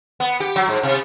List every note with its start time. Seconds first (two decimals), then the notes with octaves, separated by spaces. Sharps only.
0.20 B3
0.40 G4
0.56 F#3
0.68 G#2
0.83 C3